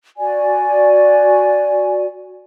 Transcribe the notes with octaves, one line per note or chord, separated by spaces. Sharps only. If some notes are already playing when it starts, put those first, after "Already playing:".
F#4 D5 G#5